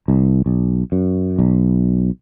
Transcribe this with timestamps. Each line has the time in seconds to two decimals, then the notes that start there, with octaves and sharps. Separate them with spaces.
0.08 C2
0.46 B1
0.92 F#2
1.39 B1